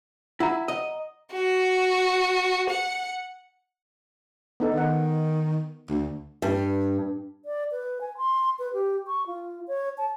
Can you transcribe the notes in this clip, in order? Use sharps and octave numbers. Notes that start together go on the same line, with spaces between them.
E4 F#5 A#5
D#5
F#4
F#5
B3 D#4 A4
D#3 D#4 F#5
D2
G2
D5
B4
G#5
C6
B4
G4
C#6
F4
C#5
A5